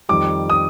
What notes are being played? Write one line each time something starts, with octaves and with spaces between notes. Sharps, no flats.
F2 D#3 G3 D6
D#6